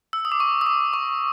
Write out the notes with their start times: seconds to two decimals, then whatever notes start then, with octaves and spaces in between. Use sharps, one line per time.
0.13 E6
0.25 D#6
0.32 D6
0.40 C#6
0.61 D#6
0.66 D6
0.93 C#6